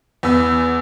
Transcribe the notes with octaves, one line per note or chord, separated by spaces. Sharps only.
E2 B3 E6